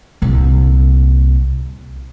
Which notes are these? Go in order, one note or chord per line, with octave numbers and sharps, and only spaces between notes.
C2 A#2